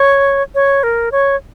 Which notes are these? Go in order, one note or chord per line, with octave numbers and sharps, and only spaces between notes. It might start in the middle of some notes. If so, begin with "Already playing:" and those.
Already playing: C#5
C#5
A#4
C#5